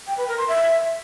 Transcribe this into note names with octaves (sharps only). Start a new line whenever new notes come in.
G5
B4
A#4
C6
E5